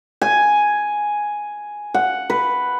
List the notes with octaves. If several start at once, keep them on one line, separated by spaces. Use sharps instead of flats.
G#5
F#5
B4